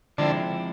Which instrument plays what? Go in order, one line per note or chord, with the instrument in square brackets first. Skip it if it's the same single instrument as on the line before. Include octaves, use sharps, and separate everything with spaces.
[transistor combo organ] D3 [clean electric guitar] F3 G#3 C4 E4